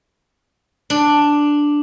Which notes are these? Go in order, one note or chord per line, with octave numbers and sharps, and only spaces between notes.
D4